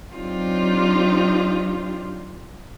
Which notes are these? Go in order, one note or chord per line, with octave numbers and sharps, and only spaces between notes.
F#3 C4 D4 D#4 F4 G4